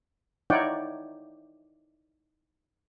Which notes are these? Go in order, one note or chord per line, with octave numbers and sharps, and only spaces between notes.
D#4 E4 C#5 D5 F#5 G5